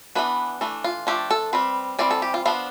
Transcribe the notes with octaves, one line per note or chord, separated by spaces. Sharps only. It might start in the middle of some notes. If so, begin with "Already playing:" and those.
E3 B3 D4 B4
E3 A3 D4
F4
F3 A3 D4 G4
A4
G3 C4 B4
E3 G3 C4 D5
A4
G4
F4
F3 B3 D4 F4